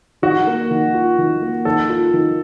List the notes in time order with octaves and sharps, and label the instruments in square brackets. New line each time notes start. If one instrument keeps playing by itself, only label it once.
[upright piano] D#3 [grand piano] F#4
[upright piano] A#3
D#3
F4
D#3
A#3
[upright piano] D#3 [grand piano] A4
[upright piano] F4
D#3